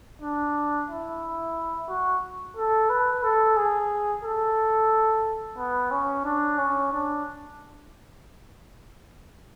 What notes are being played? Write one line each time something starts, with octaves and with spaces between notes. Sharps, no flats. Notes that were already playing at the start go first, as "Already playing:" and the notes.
D4
E4
F#4
A4
B4
A4
G#4
A4
B3
C#4
D4
C#4
D4